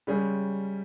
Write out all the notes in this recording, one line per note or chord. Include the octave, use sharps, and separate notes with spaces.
C#3 G3 G#3 C#4 G#4